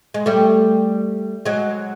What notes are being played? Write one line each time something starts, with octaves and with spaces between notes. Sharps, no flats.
G#3
G3 A3
F#3 G#3